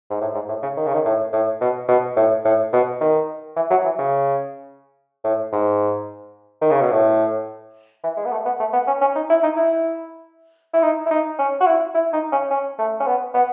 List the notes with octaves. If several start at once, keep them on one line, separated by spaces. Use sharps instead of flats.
G#2
A2
G#2
A2
C#3
D#3
C#3
D#3
A2
A2
B2
B2
A2
A2
B2
D#3
E3
F#3
E3
C#3
A2
G#2
D#3
C#3
B2
A2
E3
G#3
B3
A3
B3
A3
B3
C#4
C#4
D#4
E4
D#4
E4
E4
D#4
E4
D#4
C#4
F#4
E4
E4
D#4
C#4
C#4
A3
C#4
B3
B3